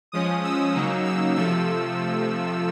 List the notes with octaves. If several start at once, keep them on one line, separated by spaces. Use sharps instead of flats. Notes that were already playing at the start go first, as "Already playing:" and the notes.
F3 G#3 C#4 D#6
E6
C#3 F#3 A#3 D#4
E6
C3 F3 A3 E6